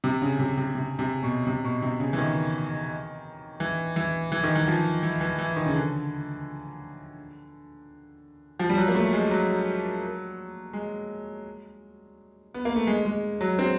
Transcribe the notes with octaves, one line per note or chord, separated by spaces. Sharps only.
C3
C#3
C3
C3
C3
C3
B2
C3
B2
C3
C#3
E3
D#3
E3
E3
E3
D#3
E3
F3
E3
E3
E3
D#3
C#3
D3
F3
G3
F#3
A#3
A3
G#3
F#3
G#3
B3
A#3
A3
G#3
G#3
F#3
C4